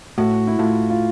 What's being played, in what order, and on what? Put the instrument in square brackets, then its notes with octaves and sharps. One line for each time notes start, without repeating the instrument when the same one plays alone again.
[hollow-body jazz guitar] A2 [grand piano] F#4
[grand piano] E4
[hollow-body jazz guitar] A2 [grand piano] F4
[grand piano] F4